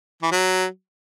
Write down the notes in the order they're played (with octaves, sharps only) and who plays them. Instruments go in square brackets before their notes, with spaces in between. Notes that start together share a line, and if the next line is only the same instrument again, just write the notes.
[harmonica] E3
F#3